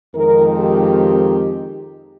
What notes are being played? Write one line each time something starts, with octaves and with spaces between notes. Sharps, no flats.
F2 D#3 G#3 C4 D#4 A#4
G4